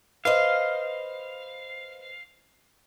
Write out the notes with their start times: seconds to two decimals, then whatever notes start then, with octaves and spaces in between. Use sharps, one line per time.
0.25 B4 C5 D#5 F5